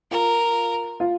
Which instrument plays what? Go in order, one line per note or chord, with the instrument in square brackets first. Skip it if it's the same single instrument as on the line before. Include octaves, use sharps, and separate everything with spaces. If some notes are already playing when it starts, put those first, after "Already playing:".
[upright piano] F4 [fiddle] A#4
[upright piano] F4